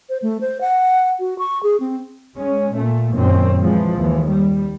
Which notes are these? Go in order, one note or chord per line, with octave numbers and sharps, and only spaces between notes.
C5
A3
C5
F#5
F#4
C#6
G#4
C4
G#3 C#4
A#2 A3
F#2 A#2 D#3 C4 C#4
E3 F3 G#3
D#2 E3
G3